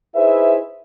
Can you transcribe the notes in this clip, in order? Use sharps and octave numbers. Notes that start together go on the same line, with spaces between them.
D#4 E4 G#4 B4 C5 E5